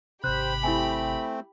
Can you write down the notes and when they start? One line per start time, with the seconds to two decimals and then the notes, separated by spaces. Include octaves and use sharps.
0.24 G#1 C3 G4 C5 B5 F#6
0.63 A3 C4 E4 G#5